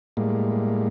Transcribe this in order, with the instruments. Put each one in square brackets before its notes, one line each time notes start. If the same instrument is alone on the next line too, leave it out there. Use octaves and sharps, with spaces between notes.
[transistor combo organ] A2 G3 G#3 A#3